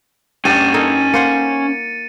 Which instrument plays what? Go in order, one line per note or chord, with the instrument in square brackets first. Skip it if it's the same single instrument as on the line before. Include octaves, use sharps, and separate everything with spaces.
[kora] G2 D4 [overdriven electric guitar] C#4 G5 [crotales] A6 D#7
[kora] D#4 A4 A#4
[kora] A#3 C5 F#5 [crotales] C#7